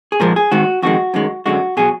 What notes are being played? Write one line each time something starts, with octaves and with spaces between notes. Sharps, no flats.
G#4
A#2 F3 G#3 A#4
G#4
G#2 D#3 G#3 F#4
F2 D#3 G#3 F#4
F#2 D#3 G#3
F#2 D3 G#3 F#4
B2 F#3 G#4